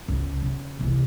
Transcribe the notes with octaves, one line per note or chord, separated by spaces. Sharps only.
C#2
C#3
E2 C3